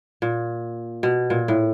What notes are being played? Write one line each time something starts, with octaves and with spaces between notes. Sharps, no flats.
A#2
B2
A#2
A2